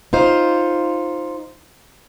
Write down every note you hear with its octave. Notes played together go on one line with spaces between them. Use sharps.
D#4 F4 C5